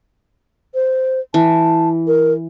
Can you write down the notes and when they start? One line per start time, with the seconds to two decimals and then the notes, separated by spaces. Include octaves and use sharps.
0.74 C5
1.34 E3 A5
2.07 A#4